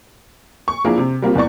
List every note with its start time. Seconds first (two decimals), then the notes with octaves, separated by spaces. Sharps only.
0.68 C#6
0.85 F3 A#3 D4 E4 G#4 A#4
0.98 C3
1.22 G3 A#3 C4 F4
1.35 E2 E3 D5 C#6